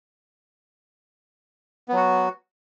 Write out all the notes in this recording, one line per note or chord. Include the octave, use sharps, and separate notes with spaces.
F#3 B3 F#4